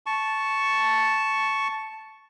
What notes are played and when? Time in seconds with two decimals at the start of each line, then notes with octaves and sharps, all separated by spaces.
0.06 A5 C#6